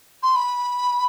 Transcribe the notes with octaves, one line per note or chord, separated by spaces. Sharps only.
C6
B5